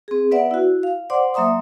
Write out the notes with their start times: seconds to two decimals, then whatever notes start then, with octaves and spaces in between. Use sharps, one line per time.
0.08 C4 G#4
0.31 B3 B4 D5 E5 F#5
0.51 E4 F#4
0.83 F5
1.10 C5 D5 F#5 C6 D6
1.34 F#3 A#3 E5 A#5 C6 D#6